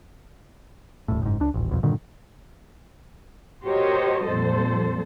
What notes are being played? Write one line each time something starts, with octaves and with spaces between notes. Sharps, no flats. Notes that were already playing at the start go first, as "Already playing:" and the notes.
D#1 A2
F#1 G#2
C#2 D4
D#1 A1
D#1 B1 F2
G2 A#2 D3 D#3
F#4 G4 A#4 C5 C#5 D#5
F2 A#2 G3 A4 C5